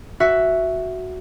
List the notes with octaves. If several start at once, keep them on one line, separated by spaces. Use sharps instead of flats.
F#4 E5